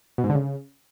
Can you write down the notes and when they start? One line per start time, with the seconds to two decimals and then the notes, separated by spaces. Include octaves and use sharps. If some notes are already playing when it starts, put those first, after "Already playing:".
0.18 B2
0.24 G#2
0.29 D3
0.35 C#3